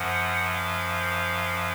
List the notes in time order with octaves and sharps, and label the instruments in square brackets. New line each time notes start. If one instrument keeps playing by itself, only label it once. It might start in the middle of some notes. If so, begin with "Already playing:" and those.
Already playing: [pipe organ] F#2 F3 F#5
F5